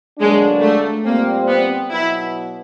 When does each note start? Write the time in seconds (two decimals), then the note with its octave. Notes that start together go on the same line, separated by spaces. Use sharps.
0.19 D3 F#3 G#3 A#3 D4
0.62 A3
1.05 A#2 G3 A#3 C4
1.48 B3
1.90 B2 F#3 B3 E4